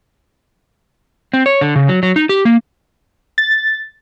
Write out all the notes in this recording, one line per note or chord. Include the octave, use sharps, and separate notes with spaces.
C4
C#5
D3
C#3
F#3
F#3
D#4
G4
A#3
A6